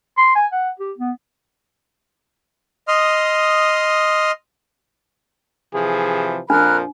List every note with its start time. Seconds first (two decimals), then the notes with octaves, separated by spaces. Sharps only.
0.18 C6
0.36 G#5
0.52 F#5
0.80 G4
0.98 B3
2.88 D#5 C6 D#6 F6
5.74 C3 E3 F3 G#4
6.50 F2 A#2 F3 D4 A#4 B5 F6 F#6